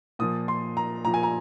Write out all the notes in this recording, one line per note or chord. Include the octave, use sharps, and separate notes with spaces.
A#2 F3 D#6
C6
A#5
A#2 F3 A#5
G#5
A#5